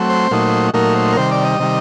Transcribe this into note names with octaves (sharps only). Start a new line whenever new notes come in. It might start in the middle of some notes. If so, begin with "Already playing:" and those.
Already playing: F#3 A3 C4
C5
A#2 F#3 A3 D#4
A#2 F#3 A3 D#4 A#4
C5
A#4
C3 D#3 G3 C5
D5
D#5
C3 D#3 G3